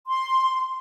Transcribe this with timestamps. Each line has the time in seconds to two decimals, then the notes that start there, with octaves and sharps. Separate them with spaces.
0.07 C6